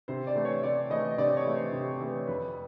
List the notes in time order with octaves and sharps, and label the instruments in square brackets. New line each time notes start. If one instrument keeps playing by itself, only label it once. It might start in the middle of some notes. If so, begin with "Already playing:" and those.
[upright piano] C3 C5
D5
E3 A3
C#5
C3 D5
E3 A3 D#5
C3 D5
C#5
E3 A3
C5
C3
E3 A3
F2 B4